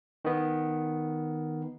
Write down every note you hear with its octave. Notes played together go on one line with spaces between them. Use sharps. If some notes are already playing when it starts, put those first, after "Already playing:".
D#3 B3